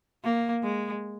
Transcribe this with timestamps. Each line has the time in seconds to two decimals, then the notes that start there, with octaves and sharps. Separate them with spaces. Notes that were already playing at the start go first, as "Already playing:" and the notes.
0.24 A#3
0.63 G#3